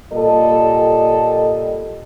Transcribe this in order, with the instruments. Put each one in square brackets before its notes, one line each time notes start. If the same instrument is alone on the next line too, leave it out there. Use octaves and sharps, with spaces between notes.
[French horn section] A#2 G3 A4 D#5